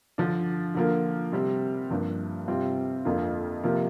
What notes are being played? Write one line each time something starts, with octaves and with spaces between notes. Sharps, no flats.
D3 F3 D4
D3 F3 A#3 F4
C3 G3 C4
G2 F3 A#3
C3 G3 C4 F4
F2 D3 A#3 F4
C3 F3 A#3 F4